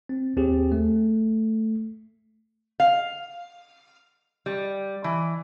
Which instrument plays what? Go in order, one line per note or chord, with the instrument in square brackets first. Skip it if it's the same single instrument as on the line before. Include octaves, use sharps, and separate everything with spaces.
[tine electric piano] C4
D#2 C4 G4 G#4
A3
[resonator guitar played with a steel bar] F5
G3
E3